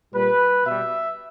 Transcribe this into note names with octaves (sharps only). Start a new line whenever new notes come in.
A#2 G3 B4
B2 G3 E5